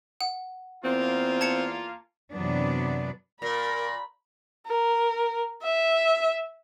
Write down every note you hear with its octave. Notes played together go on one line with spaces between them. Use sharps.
F#5
E2 A#3 C4 F4
A5 G#6 C#7
F#2 C3 E3 F#3 B3 D4
A#2 A#4 B5 A#6
A#4
E5